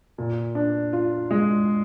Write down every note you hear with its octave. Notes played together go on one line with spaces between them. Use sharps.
A#2
D4
F4
G#3